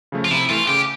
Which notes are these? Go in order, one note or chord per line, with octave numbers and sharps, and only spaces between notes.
C#3 F3 A3
F4
C3 E4
E3 A3 F4
C#3 G4